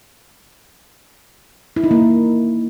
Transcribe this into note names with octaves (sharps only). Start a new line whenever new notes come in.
E4
D#4
A#3